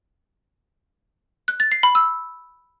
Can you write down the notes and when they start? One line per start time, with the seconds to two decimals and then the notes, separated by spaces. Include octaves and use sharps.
1.48 F#6
1.60 A6
1.72 C7
1.83 B5
1.95 E6